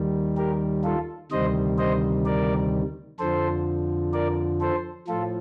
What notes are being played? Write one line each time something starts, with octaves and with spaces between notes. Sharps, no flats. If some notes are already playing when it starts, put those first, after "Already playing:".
Already playing: D#2 D#3 G3
G4 A#4
F4 A4
D2 C3 D#3 G3 C5 D#5
C5 D#5
A#4 D5
F2 D3 F3 A4 C5
A#4 D5
A4 C5
A2 F3 F4 A4